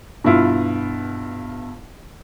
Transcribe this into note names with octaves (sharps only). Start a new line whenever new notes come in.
G2 B2 E4 F4